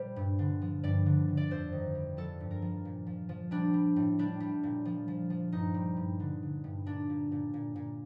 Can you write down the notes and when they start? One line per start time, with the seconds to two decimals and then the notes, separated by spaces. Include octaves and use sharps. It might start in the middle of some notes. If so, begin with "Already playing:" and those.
Already playing: A#2 G3 C5
0.16 G2
0.39 D3
0.62 F3
0.84 G2 D5
1.06 D3
1.28 D3
1.37 D5
1.51 F2 C5
1.72 D#3
1.95 G3
2.17 F3 A4
2.40 G2
2.51 A#4
2.62 F3
2.85 A#2
3.07 F3
3.29 F3
3.51 G3 D4
3.73 G3
3.96 A2
4.19 G3 D4
4.40 G3
4.63 A#2
4.85 F3
5.08 F3
5.30 F3
5.52 G2 D#4
5.74 G3
5.97 G2
6.20 D3
6.42 D3
6.64 G2
6.86 A#2 D4
7.09 A#2
7.32 A#2
7.54 A#2
7.76 A#2